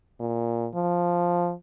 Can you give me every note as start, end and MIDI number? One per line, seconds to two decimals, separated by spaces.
0.20 0.68 46
0.75 1.53 53